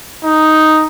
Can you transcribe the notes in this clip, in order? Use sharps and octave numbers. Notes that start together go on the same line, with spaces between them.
D#4